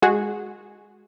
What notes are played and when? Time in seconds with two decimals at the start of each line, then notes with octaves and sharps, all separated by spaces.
0.02 G#3 F#4 G#4